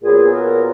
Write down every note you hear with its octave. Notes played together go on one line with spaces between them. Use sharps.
A#2 F#3 B3 G#4
A#4